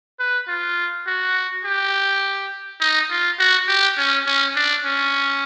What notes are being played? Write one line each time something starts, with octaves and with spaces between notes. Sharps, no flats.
B4
F4
F#4
G4
D#4
F4
F#4
G4
C#4
C#4
D4
C#4